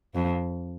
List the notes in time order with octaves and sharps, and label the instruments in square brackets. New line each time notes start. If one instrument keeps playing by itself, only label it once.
[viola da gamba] F2